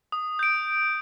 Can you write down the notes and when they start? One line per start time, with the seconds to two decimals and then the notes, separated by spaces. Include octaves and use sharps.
0.12 D#6
0.39 G6 D7